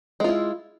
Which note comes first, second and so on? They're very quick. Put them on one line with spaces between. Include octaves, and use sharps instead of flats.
G#3 F4 E4